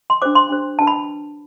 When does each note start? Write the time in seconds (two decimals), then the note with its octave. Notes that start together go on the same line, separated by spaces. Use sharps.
0.10 C6
0.22 D4 G4 C5 D6
0.35 C6
0.49 D4 G4 C5
0.79 D4 F#4 B4 A5
0.87 B5